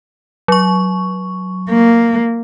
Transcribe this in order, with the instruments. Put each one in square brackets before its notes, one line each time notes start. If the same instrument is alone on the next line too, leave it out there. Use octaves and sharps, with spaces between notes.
[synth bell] F#3 C#6
[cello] A#3